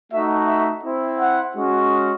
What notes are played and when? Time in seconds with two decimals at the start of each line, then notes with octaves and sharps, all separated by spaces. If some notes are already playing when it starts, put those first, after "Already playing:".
0.12 A3 D#4 F#4 E5
0.48 E5
0.84 C4 E4
1.20 F#5
1.56 G#3 C#4 F#4